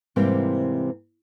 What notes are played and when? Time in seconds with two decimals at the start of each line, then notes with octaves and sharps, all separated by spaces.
0.16 G#2 C3 E3 G3 A#3 C4